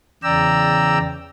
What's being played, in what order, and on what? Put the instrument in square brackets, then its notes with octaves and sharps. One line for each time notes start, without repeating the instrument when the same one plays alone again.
[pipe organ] E2 C#3 D5 G5 A#5 E6